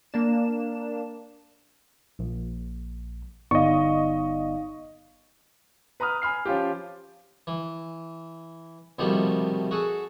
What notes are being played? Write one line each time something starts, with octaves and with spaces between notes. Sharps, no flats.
A#3 D4 E7
A#1
G1 B3 D#4 D5 D#5 F5 C#6
B4 A#5 B5 D#6 F6
G#5 B5 F6 C7
F3 C#4 F4 G4
E3
C2 B2 D#3 F3 G3 A3
F#4 G#4 A4